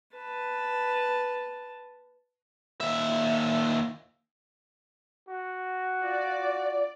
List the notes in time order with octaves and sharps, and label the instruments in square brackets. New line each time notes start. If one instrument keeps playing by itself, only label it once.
[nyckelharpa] B4 A5
[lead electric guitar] D#2 E5
[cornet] F#4
[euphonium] F4 [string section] D5